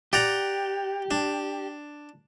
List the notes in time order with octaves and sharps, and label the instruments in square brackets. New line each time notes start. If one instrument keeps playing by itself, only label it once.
[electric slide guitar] G4 [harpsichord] D5 F#5 A#5
[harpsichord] D4